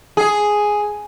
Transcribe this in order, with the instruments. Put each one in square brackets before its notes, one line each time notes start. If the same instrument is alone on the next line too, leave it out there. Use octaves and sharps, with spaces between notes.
[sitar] G#4